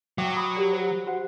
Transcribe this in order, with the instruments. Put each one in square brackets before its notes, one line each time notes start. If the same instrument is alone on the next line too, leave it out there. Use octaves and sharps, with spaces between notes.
[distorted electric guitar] F#3 [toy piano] E5 G5 D6
[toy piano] B5 C#6 D#6
G4 A#4 D5
C5
F#4 C5 F#5